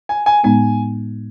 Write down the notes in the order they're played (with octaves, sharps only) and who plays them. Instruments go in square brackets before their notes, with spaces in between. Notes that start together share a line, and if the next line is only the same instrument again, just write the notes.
[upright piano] G#5
G#5
[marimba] A2 G#3 B3 D#4 [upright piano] G#5